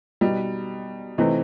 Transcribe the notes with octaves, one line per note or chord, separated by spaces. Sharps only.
B2 G3 D#4
C3 E3 A3 C4 D#4